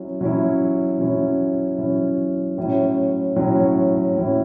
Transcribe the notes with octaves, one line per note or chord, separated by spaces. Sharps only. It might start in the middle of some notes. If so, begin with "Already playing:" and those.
Already playing: F#3 C#4 E4
F#3 C#4 E4
F#3 C#4 E4
F#3 C#4 E4
A2 F#3 C#4 E4
A2 F#3 C#4 E4
A2 F#3 C#4 E4